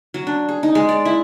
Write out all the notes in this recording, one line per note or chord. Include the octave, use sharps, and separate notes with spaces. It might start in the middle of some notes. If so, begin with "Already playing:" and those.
F#3
D4
G#4
D#4
G#3
D5
E4